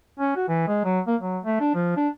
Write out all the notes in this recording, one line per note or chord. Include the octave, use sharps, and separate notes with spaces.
C#4
F#4
E3
G#3
F#3
A#3
F#3
A3
D4
F3
D4